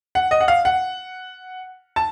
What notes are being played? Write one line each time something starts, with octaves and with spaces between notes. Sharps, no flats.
F#5
D#5
F#5
F5
F#5
A5